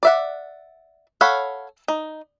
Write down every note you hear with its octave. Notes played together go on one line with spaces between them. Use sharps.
D5 E5 F#5
A4 C#5 F5 F#5 B5
D#4